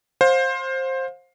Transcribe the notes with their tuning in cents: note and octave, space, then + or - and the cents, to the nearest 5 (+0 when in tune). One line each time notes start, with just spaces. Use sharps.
C5 +15 F5 +30